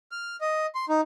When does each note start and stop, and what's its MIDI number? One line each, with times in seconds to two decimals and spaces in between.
0.12 0.36 89
0.41 0.66 75
0.75 0.85 84
0.89 1.01 63